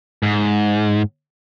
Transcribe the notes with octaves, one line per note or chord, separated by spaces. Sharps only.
G#2